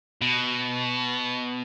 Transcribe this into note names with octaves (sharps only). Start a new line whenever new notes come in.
B2